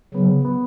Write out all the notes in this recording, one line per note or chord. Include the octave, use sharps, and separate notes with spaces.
C#3 F#3 B3
B3